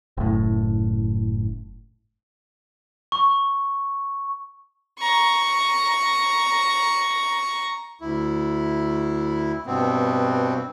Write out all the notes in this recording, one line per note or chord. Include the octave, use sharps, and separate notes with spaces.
F#1 A2
C#6
A#5 C#6
D2 E4
G2 B2 B3 C4